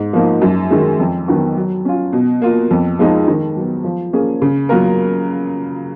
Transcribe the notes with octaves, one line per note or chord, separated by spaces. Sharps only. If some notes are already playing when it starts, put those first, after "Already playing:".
Already playing: G#2
F3 A#3 D#4
F#2
D#3 G#3
F2
D#3 F#3 B3 F#4
F#3
C#4 F4
B2
A#3 F4
F2
F3 G#3 D#4 G#4
D#3
F#3 B3
F3
A#3 C#4 G#4
C#3
F#3 A#3 F4 A#4